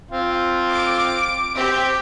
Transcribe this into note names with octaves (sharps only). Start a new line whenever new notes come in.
C4 F4
D6 D7
C4 G4